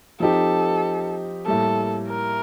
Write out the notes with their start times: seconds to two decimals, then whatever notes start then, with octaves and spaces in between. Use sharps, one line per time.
0.20 F3 C4 D#4 G4 A4
1.46 A2 G3 A#3 A4
2.08 A#4